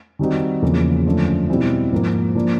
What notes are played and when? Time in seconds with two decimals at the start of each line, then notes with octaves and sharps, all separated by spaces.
0.19 D#3 G3 C4 D#4 F#4
0.62 E2 C#3 F3 A#3
1.06 F#2 D3 F3 A3
1.49 B2 G3 C4 E4
1.92 G#2 F3 A#3
2.35 F3 A#3 D4